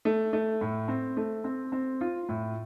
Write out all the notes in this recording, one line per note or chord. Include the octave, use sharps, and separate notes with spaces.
A3
A3
A2
C4
A3
C4
C4
F4
A2